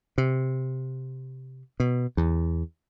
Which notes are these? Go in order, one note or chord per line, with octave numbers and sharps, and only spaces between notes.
C3
B2
E2